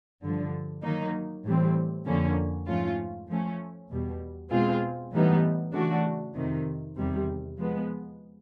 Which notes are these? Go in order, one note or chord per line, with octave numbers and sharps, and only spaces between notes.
G2 D3 F3
D#3 F#3 A#3 D#4
A2 E3 G3 C4
F2 D3 F3 A#3 C#4
G#2 F3 A3 C#4 F4
F3 A3 C#4
E2 B2 G3
B2 G#3 C4 F4 G#4
A2 E3 G3 B3 D#4
C#3 E3 A3 D4 F#4
F2 C3 D#3
E2 C3 D#3 G3
F3 G#3 B3